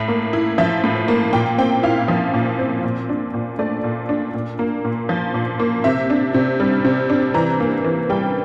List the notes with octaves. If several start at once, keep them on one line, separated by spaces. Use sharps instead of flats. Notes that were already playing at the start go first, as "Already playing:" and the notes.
Already playing: A2 E5
A#3
E4
F3 E5
A2
A#3
A#2 G5
C4 G5
E4 F5
F3
A#2
C4
A#2
D4
A#2
A3 D5
A#2
D4
A#2
A#3
A#2
F3
A#2
A#3
C3 E5
D4
C3
G3
C3
D4
E3 A#5
A#3
E3
G3 G5